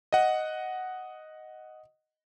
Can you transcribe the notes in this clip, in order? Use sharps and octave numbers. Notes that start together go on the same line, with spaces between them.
D#5 F#5